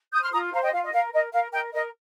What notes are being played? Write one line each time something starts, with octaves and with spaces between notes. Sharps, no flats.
C5 D#6 G6
C6 F6
F4 A#5 D#6
C5 F5 A#5
D#5 G5
F4 F5
D#5
A#4 F5
A#4 D#5
A#4 F5
A#4 D#5 G5
A#4 D#5